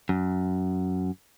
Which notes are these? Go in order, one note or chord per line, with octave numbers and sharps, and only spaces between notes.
F#2